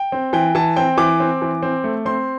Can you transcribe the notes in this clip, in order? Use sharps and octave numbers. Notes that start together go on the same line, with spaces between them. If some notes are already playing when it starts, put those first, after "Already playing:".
Already playing: G5
C4
E3 G5
E3 A5
C4 G5
E3 D6
C4
E3
C4
A3
C4 C6